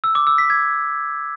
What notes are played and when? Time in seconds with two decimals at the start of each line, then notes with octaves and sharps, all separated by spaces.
0.04 E6
0.15 D6
0.27 E6
0.38 B6
0.50 G#6